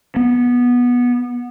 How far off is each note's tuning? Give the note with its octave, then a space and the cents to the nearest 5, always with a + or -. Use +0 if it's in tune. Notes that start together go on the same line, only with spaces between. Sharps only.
B3 -15